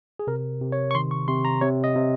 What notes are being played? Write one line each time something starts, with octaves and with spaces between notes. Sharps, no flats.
G#4
C3 A#4
C3
C#5
C#6
D#3 C6
C#6
C3 C6
A#5
C3 C#5
D#5
C3